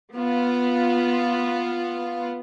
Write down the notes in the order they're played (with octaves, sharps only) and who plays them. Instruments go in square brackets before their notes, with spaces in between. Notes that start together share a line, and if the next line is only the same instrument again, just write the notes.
[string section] B3 F4